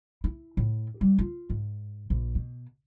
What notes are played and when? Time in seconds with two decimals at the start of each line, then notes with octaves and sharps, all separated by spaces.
0.24 E4
0.57 A2
1.01 G3
1.19 F4
1.50 G#2
2.10 A#1
2.35 B2